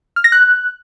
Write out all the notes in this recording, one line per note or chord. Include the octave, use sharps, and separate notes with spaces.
F6
A#6
F#6